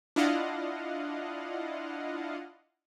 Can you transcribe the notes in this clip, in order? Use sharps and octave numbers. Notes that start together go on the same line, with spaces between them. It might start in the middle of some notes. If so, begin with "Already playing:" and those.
D4 E4 F4 D#5 F5 F#5